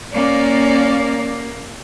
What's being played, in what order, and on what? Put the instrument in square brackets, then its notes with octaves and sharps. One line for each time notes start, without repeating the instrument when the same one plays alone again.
[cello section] A#3 [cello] C#4 D5